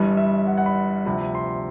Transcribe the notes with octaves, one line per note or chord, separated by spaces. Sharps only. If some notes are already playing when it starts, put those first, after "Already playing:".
Already playing: G1 G2 E3 G3
E5
F#5
F#5
B5
D2 C3 F3 B5
C6